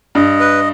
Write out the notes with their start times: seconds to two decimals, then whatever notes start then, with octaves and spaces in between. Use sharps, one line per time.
0.15 G2 D#5
0.40 B4